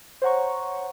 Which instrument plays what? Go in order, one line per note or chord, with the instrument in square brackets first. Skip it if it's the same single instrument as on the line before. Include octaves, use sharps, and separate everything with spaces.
[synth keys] C5 C#5 F#5 A#5 C#6